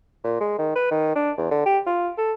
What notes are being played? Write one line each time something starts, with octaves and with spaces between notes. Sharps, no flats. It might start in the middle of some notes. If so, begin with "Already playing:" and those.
A#2
G#3
D#3
B4
D#3
D4
E2
D3
G4
F4
A4